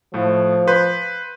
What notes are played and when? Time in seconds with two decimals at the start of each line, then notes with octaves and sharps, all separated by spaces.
0.14 A2 F3 A3
0.68 B4 C6 G6